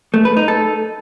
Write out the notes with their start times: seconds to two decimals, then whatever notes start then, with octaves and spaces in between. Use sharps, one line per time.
0.14 A3
0.25 B4
0.37 D#4
0.48 A4